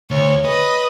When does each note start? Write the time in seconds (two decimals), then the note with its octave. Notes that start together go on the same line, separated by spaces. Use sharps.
0.11 D2 C#5
0.45 B4 D#5